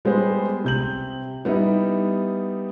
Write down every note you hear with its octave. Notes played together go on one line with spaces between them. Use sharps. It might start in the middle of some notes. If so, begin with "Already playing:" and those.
G3 G#3 B3 G4 C5
C3 G6 F#7
G3 B3 D#4 E4